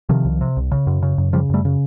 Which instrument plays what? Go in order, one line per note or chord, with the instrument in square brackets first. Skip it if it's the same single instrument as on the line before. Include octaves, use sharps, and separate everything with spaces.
[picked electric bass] C3 D#3 F3
C2
C3
C2
C#3
F#2
C#3
F#2
C#3 F3 G3
F#2 G3 A3
C#3